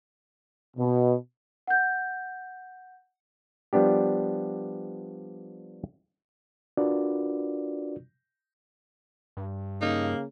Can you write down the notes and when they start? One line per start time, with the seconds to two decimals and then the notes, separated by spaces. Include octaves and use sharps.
0.77 B2
1.67 F#5 G6
3.73 F3 G3 B3 D4 G4
6.77 D4 F4 F#4 A#4 B4 D5
9.37 G2
9.82 C#3 A#3 D#4